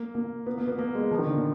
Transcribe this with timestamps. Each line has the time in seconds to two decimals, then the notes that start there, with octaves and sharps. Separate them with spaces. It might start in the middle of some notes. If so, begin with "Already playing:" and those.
Already playing: A#3
0.15 A#3
0.46 B3
0.58 A#3
0.67 B3
0.79 A#3
0.95 G#3
1.11 F3
1.19 D#3
1.26 D3
1.35 A#2